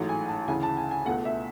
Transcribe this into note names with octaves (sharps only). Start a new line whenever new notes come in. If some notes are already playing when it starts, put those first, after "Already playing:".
Already playing: A1 G#2 F#3 A3
G#5
A5
D2 C#3 E3 G#5
A5
G#5
G#5
C#2 B2 A3 F#5
E5